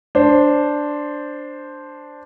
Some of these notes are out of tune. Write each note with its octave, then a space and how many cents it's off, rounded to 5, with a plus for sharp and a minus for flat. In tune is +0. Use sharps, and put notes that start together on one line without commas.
D4 +0 C5 +0